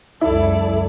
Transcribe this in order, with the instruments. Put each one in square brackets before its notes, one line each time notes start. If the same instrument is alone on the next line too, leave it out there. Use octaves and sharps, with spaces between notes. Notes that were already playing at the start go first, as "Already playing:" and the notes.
[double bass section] C#2 F#2 [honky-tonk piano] E4 [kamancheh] A4 D5